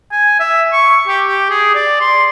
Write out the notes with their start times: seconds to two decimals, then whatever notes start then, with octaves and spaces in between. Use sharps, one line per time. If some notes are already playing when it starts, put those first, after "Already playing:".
0.12 G#5
0.40 E5
0.73 C#6
1.08 G4
1.26 G4
1.50 G#4
1.75 D5
2.01 C6